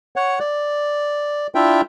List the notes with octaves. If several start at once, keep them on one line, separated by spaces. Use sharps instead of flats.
C#5 F#5
D5
D4 E4 F4 E5 G5